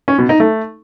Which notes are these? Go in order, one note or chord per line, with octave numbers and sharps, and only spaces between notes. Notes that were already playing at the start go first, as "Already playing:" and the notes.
C#4
B2
D#4
A3